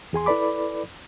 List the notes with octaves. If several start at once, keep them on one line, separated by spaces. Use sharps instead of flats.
E2 G#4 G#5 C6
E4 A4 B4 D5 B5 D6